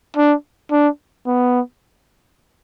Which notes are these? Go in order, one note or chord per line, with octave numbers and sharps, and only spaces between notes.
D4
D4
B3